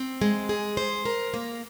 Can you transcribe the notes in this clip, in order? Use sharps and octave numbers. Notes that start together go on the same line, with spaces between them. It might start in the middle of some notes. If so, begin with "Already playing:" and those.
Already playing: C4
G#3
G#4
C5
A#4
A#3